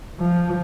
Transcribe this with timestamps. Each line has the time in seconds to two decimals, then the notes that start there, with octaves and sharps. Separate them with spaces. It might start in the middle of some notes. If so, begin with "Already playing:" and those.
0.20 F3